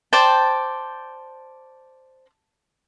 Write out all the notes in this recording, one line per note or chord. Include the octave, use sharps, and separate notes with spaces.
C5 D5 G5 A5